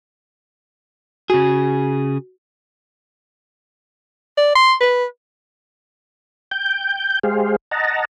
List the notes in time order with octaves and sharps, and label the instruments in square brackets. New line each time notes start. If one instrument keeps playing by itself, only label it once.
[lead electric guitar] C#3 G#4 [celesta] F#4
[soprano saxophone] D5
C6
B4
[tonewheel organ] G5 G6
G#3 G4 G#4 C5 F5
D#5 F#5 A5 A#5